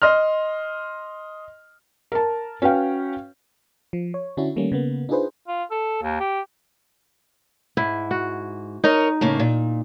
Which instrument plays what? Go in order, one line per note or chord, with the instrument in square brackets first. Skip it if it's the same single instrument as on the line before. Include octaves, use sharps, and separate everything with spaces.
[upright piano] D#5 C6 F6
[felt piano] A#4 A5
C#4 F#4 B4 C#5 F5 G5
[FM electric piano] F3
C#5
D3 C#4 D4 E4 F#4
D#3 G3 A3 A#3 C#4
C#3 A#3 B3
D4 D#4 F4 G#4 B4 C5
[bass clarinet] F4
A4
D#2
G4
[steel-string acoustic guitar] G#2 [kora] E4
[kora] F#4
[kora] D#4 [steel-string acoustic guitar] A#4 C#5 D#5
[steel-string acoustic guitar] A2 C#3 A#3
A#2